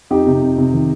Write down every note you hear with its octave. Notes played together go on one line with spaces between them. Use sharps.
F2 D#4 G4
C3
F2
C3
D#3